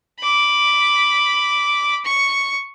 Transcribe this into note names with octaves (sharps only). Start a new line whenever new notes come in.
B5 D6
C#6